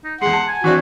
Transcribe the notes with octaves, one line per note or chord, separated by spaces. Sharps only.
D#4
E2 G#3 F#5 C6
A5
G#5
E3 C4 D4 F#4